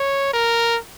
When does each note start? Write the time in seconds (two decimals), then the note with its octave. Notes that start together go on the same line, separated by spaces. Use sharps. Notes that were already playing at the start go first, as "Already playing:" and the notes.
Already playing: C#5
0.33 A#4